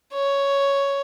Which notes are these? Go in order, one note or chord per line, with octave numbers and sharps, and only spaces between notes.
C#5